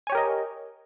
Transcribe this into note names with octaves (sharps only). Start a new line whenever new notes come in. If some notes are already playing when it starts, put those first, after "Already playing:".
G4 A#4 C#5 D#5 G#5